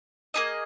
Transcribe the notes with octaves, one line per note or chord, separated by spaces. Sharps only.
A#3 D#4 G#4 D#5